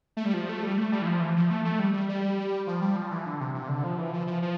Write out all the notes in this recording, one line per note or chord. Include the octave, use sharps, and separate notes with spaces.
A3
G3
F3
A3
G3
A3
G3
E3
F3
E3
F3
A3
A3
G3
G3
G3
F3
G3
F3
E3
D3
C3
C3
D3
F3
E3
F3
F3
F3